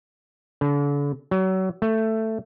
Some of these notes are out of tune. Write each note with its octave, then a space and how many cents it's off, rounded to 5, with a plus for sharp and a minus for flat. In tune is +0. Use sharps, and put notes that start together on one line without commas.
D3 -40
F#3 +30
A3 +10